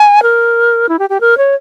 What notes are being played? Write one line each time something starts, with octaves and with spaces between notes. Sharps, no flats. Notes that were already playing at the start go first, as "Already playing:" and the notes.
Already playing: G#5
A#4
E4
G4
G4
A#4
C#5